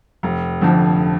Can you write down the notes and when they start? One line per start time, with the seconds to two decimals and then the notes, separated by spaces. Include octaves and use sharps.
0.23 F1
0.61 F2 D3 F3